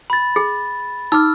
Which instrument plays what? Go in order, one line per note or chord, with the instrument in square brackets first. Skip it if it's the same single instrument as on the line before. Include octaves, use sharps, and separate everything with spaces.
[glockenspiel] B5 A6
[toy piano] G#4
[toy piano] D#4 D6 [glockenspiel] E6 F6